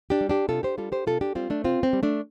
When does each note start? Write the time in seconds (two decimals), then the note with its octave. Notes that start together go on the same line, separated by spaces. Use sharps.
0.10 D4 G4
0.21 G3
0.29 D4 G4
0.49 C3 F4 A4
0.63 G4 C5
0.78 G3 F4 A4
0.92 G4 C5
1.07 C3 F4 A4
1.21 D4 G4
1.35 G3 C4 F4
1.50 A3 D4
1.64 C3 C4 F4
1.83 C4
1.93 G3
2.03 A3 D4